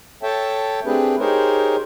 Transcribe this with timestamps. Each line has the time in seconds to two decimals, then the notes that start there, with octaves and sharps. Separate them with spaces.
0.23 A4 C#5 E5 G5 A5
0.85 A3 C4 D4 G4 G#4 B4
1.19 D#4 G4 G#4 A#4 C5 C#5